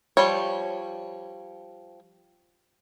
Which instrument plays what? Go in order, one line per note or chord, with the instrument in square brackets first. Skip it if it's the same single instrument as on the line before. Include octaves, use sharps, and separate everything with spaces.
[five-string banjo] F3 G3 C#5